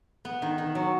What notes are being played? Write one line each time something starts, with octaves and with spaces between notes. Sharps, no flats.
B3
D#3
D#3
F#3